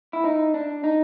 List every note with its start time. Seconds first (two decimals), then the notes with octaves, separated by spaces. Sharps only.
0.13 E4
0.24 D#4
0.54 D4
0.84 D#4